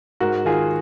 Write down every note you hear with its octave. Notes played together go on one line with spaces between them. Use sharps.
G#2 F#4 A#4
D#3 F4 G#4